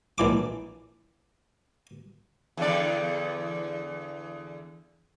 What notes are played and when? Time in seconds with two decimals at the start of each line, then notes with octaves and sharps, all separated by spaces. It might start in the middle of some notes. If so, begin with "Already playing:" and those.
0.18 A#1 E3 D6
2.57 E2 D3 D5